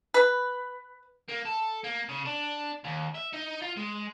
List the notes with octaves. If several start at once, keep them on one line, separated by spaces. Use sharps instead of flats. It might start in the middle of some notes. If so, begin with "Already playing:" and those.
B4
A#3
A4
A#3
C#3
D4
D#2
E5
D#4
F4
G#3